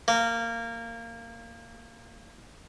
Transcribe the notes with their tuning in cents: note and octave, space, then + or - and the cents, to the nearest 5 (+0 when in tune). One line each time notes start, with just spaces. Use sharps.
A#3 -15